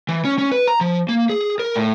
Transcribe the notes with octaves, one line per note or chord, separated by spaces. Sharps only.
E3
C#4
C#4
B4
A#5
F3
A#3
G#4
A#4
A2